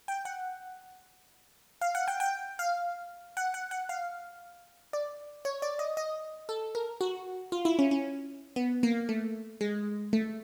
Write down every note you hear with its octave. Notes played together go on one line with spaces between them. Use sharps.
G5
F#5
F5
F#5
G5
G5
F5
F#5
F#5
F#5
F5
D5
C#5
D5
D#5
D#5
A4
A#4
F#4
F4
E4
C#4
C#4
B3
A#3
A3
G#3
A3